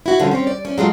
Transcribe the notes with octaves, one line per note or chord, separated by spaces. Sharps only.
E4 F#4
A#2 D3 G3 C#4 F4
C4 C#4 C#5
D5
C#4 D5
F#3 G#3 A3 F4